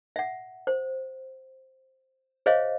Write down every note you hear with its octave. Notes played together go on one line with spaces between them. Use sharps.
E5 F#5
C5
G#4 C5 C#5 D#5 F5